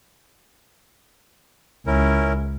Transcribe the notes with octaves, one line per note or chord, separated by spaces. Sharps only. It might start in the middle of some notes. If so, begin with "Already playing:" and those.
C#2 C#4 E4 A#4